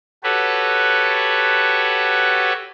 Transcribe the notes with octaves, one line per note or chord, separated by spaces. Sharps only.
F#4 G4 A4 B4 C#5